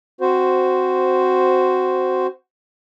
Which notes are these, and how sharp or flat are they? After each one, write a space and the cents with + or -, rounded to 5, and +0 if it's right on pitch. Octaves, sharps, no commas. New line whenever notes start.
C4 +0 F#4 +0 C5 -5